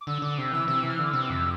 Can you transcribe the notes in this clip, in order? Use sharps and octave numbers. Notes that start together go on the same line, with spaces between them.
D6
D3 E6
D3 D6
C3 E6
E3 E6
C3 E6
E3
F6
D3
D6
C3 E6
D6
F2 E6